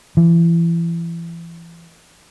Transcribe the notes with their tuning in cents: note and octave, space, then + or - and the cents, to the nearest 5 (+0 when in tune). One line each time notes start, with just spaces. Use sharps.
E3 +35